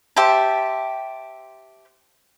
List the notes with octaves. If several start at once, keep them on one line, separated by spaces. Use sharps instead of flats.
G4 C5 E5 A5